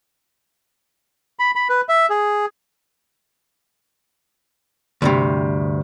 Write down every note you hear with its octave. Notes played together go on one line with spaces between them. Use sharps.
B5
B5
B4
E5
G#4
D2 G2 C3